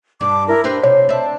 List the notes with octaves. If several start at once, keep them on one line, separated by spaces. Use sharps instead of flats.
G2 D4 D6
E4 A#4
D4 G4 B4 C5
C3 C#5
D4 E5